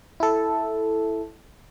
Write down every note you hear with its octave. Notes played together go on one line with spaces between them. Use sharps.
E4 A4